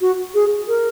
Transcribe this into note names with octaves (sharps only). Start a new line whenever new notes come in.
F#4
G#4
A#4